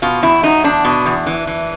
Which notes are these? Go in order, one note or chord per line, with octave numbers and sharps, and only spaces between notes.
B2 F4
E2 E4
F#3 D#4
E2 D4
B2
E2
E3
E3